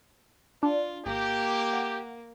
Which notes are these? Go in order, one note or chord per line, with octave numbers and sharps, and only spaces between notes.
D4 F4
G#1 A#3 G4
F#5